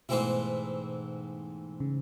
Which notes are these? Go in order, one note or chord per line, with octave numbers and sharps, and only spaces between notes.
G#2 B2 E3 A3 C4 E4
C#3